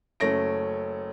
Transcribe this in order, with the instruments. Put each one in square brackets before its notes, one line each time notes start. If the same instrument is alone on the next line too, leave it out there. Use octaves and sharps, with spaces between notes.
[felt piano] F#1 A3 C#4 A#6 D7